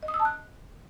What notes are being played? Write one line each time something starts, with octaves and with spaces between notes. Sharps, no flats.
D#5
D#6
E6
A5
F#6